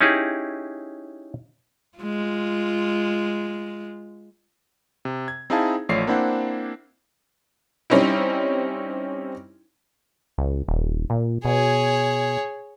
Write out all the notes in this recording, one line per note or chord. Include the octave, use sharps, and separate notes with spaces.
C#4 D#4 E4 G4 G#4
G#3 F4
C3
G#6
C4 D#4 E4 G#4 F5 A5
A1 F3 A3 C#5 D5 C7
A#3 C4 D4 E4 C5 F#5
G3 C4 C#4 D#4 E4
C#2
D#1
A#2
B2 G#4 C#5